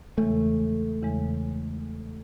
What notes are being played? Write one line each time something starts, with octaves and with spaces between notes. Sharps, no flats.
E2 C#3 E3 G#3 A3
E2 C#3 E3 G#3